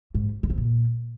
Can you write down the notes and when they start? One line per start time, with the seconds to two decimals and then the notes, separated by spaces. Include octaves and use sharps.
0.15 G#2
0.43 D3
0.50 C3
0.58 A#2